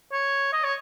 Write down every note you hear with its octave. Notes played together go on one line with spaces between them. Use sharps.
C#5
D#5
C#5